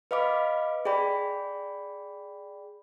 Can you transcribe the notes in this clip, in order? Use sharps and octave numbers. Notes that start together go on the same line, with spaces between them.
B4 D#5 F5 B5 D6
G#4 D5 G5 B5